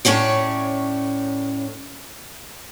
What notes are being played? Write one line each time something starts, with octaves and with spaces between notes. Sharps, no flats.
A2 C#4 C#5 D5